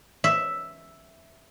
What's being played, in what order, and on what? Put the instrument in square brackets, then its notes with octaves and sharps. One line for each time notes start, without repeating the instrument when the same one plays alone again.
[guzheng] E5